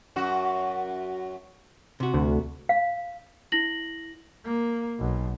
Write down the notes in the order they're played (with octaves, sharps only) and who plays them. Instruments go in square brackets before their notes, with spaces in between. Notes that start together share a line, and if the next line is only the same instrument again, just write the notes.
[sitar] F#2 F#4
[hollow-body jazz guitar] C3 F#4
[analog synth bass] D2
[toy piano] F5
[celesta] E4 A#6 F#7
[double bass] A#3
B1